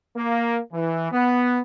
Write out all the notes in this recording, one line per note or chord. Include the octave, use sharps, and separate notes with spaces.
A#3
E3
B3